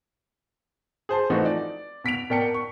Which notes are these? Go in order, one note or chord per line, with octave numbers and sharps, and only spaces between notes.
G#4 C5 A5 C6
E3 F3 A3 C4 D#4 F#4
D5
B2 B6 D7 F7
B2 A#4 D5 G5 A5 C#7
C#6